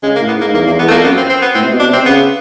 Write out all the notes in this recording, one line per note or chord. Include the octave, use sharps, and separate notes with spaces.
C#3 G#3
A#3
A2
B3
G#2 A#3
E2 A#3
E2 A#3
E2 B3
A3
F2 A#3
F#2 B3
C4
C4
B3
A2 C4
C3
B2
D4
C3 C4
C#3 B3